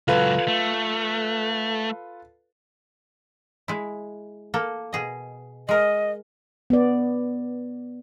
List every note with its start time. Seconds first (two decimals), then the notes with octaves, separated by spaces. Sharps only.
0.08 C#2 F#3 F4 A4 B4
0.48 A3
3.68 G#3 E4
4.54 A#3 A4
4.93 B2 G#4 D#5
5.69 G#3 A#4 D#5
6.70 B3 D5